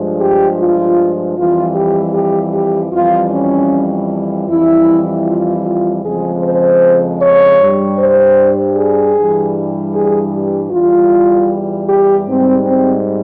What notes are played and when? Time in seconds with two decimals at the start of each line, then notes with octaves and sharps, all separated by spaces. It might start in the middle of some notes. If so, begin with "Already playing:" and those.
Already playing: G2 F3 G#3
0.20 G4
0.58 F4
1.37 F2 E3 G3 F4
1.75 G4
2.14 G4
2.53 G4
2.92 F2 E3 G3 F4
3.31 C#4
4.48 F2 E3 G3 E4
5.27 F4
5.65 F4
6.04 F2 C#3 F3 G#3 G#4
6.43 C5
7.21 C#5
7.60 G2 G3
7.99 C5
8.76 G#4
9.15 G2 E3 G3
9.94 G#4
10.33 G4
10.71 E2 E3 G3 F4
11.88 G4
12.28 G#2 G3 C4
12.66 C4